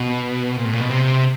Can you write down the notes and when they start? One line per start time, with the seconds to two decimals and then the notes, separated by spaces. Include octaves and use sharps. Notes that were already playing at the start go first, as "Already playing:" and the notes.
Already playing: B2
0.57 A#2
0.65 A2
0.73 A#2
0.81 B2
0.90 C3